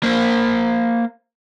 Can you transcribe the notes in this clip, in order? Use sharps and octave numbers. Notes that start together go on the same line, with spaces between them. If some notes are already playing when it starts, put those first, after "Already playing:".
A#3 C5